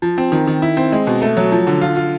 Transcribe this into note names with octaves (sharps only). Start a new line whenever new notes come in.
F3
C4
D#3
D#3
E4
C4
G#3
B2
A3
F#3
F3
D3
F4
F4